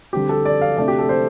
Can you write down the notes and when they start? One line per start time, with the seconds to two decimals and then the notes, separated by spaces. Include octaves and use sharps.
0.13 D3 G3 C4 G4
0.29 A4
0.45 D5
0.61 F5
0.77 C3 A3 D4 D5
0.88 G4
0.99 A4
1.09 C5